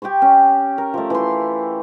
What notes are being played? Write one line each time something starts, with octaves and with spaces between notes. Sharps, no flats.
G4 G5 C6 C#6
C#4
A#4
F3 A3
E3 C6